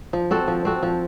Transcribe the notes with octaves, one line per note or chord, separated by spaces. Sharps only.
F3
C4 F#4 A4
F3
C4 F#4 A4
F3